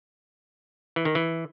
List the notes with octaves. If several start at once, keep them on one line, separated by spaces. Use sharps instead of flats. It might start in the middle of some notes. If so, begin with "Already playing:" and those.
E3
D#3
E3